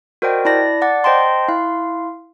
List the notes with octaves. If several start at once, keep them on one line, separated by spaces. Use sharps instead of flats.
F#4 A#4 C5 D5 D#5 G5
E4 D5 A5 B5 A#6
D5 F#5 A5 D6 A6
C5 D#5 G5 A5 C6
E4 F5 C6